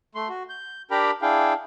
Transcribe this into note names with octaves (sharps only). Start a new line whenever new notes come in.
A3 C6
F#4
G6
D4 G4 A#4 G5 A#5 B5
D4 E4 G#4 F5 G5